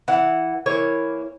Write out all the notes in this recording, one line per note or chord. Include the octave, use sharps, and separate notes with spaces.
E3 F#5
E3 A#3 C#5